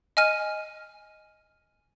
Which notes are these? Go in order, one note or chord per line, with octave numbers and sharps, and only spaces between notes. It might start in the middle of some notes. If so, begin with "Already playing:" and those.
D#5 G#5 F6 D#7